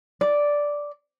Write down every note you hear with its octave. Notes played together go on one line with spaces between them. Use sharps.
D5